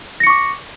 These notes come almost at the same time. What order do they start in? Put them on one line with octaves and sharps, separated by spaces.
A#6 C#7 C#6 D6